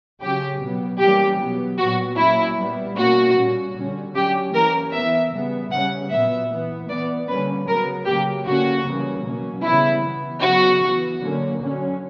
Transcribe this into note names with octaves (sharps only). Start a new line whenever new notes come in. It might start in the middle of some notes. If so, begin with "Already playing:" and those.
C#3 F#3 C#4 G4
B2 F#3 B3
E3 G3 A#3 C#4 G4
B2 F#3 B3
A#2 F#3 B3 F#4
A#2 F#3 A#3 C#4 E4
A#2 G3 B3
B2 A#3 C#4 F#4
A#2 G3 C#4
D3 G3 C#4
D3 F#3 C#4 G4
E3 A#3 C#4 A#4
E3 B3 E5
C#3 G3 B3
C#3 G3 C#4 F#5
A#2 F#3 B3 E5
E3 B3
E3 B3 D5
D3 G3 A#3 C#4 B4
C#3 F#3 B3 A#4
C#3 F#3 A#3 G4
D3 A#3 C#4 F#4
C#3 E3 G3 A#3 C#4
B2 F#3 A#3 C#4
C#3 E3 G3 B3 E4
E3 B3
C#3 F#3 B3 F#4
E3 B3
D3 F#3 A#3 C#4
D3 F#3 C#4